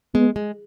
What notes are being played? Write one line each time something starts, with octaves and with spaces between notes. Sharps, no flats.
G#3 B3
G#3